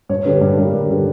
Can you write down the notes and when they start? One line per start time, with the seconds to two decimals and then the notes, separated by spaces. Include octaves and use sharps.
0.09 G2 C#5
0.25 D3 G3 B4
0.41 G2 B4
0.57 D3 G3 A#4
0.74 G2
0.90 D3 G3